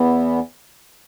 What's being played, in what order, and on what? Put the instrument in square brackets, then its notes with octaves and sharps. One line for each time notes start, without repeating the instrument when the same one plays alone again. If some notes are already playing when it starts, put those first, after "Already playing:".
Already playing: [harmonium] E2 E3 B3